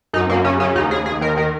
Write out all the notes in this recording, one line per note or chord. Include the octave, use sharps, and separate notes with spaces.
F#2 D#4
F#2 A#3
C#3 C#4
C#3 C#4
D#2 D#4
D#2 G#4
D#2 G#4
D#3 A#4
D#3 A#4